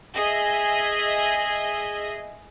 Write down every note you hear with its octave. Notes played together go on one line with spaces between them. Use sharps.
G#4 D#5 E5